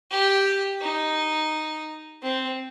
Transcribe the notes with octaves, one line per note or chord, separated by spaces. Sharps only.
G4
D#4
C4